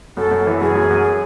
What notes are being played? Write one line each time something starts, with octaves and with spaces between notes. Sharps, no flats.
F#2 A4
F#2
E3
F#2 G#4
F#2
F#2